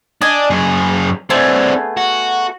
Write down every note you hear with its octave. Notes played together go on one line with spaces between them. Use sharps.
D4 D#5 G#5
F#2 G#4
A3 B3 C4 D4 G#4
F#4